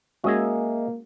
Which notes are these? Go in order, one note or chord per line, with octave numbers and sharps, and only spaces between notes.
G#3 A#3 C#4 F#4 G#4 D#5 E5